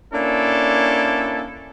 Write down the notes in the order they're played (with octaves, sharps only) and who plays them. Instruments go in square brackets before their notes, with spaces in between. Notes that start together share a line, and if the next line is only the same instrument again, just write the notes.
[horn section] A#3 C#4 D4 E4 A4